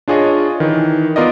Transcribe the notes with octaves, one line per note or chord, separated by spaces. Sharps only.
D4 F4 G#4 C#5 D#5
D#3 E3
B3 F4 A#4 D5 D#5